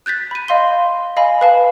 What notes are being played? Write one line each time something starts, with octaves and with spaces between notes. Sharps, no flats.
F#6 G6 A6 B6
B5 D#7
D#5 F5 C6 G7
D#5 F5 G#5 B5
B4 F5 A5